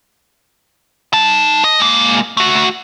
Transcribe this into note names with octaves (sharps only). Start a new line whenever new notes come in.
D#4 A5
D#5
G#3 A#3
A3 F#4